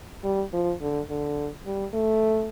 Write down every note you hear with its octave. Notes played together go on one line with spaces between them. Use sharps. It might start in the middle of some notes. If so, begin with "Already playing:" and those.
G3
F3
D3
D3
G3
A3